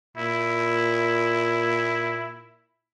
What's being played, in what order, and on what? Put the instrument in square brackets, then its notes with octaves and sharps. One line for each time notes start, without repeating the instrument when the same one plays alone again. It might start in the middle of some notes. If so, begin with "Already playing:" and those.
[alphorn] A#2 [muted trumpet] E4